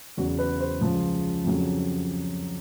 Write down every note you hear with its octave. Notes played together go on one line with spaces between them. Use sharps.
E2 C#3 F#3 F#4
B4
C5
C#2 C#3 F3
F2 C#3 F#3